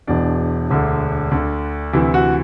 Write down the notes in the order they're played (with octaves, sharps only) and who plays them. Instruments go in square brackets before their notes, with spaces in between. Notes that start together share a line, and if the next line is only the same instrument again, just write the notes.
[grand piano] E1 E2 B2 D4
E1 D2 D3
D2 D3
D2 C3 E3 E4
F#4